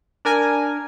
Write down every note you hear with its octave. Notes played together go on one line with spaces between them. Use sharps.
D4 A#4 G#5